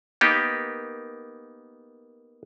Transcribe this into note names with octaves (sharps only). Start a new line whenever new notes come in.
A#3 B3 D#4 G4 A#4